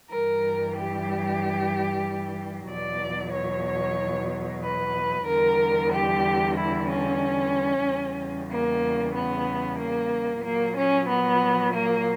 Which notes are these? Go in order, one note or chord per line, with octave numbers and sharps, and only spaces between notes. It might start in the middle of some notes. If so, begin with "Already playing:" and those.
G2 E3 G3 A#4
G4
E2 B2 F#3 D5
C#5
B4
E2 D3 G3 A#4
G4
E4
C#4
E2 C#3 G3
A#3
B3
A#3
A#2 F#3 A#3
C#4
B3
A#3